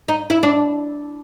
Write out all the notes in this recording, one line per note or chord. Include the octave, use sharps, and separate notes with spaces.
D#4
E4
D4